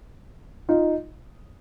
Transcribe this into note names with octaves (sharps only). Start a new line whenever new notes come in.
D#4 F4